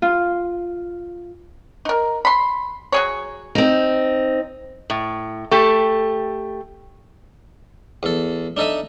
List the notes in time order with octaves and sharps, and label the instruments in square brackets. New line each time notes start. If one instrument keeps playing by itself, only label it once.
[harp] F4
[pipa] D#4 A#4
B5 C6
F#3 G#4 C#5
[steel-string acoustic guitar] C4 D#4
[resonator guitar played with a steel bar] A2
A3 G4 A4
[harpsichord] E2 A4
D4 D#4 A4 D#5 E5